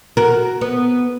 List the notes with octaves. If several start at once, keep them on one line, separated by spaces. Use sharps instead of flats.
F#4 A#4
B3